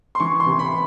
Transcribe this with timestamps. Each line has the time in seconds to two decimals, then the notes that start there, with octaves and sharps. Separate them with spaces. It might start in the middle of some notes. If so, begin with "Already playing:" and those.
0.15 C6
0.20 E3 C#6
0.40 C6
0.46 C3
0.59 B5